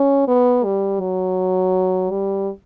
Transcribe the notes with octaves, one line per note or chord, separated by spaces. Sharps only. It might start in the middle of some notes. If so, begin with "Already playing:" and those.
Already playing: C#4
B3
G3
F#3
G3